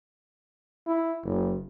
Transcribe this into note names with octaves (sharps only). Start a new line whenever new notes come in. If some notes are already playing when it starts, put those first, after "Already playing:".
E4
F#1